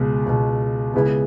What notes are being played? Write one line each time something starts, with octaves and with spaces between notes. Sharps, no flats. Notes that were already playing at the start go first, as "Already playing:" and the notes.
Already playing: C#2 B2 G#3
C#2 B2 G#3
C#2 C#3 G#3 B3 E4